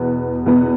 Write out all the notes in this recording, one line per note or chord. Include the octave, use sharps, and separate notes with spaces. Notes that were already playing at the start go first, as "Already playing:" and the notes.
Already playing: E2 B2 B3
E2 B2 B3